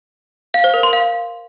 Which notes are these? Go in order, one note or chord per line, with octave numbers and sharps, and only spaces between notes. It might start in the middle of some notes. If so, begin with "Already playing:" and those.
F5
C5
A#4
C6
F5